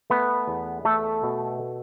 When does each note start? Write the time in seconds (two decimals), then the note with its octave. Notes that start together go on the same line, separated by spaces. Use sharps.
0.10 A3 B3 B4
0.48 E2
0.85 A3 A4
1.23 B2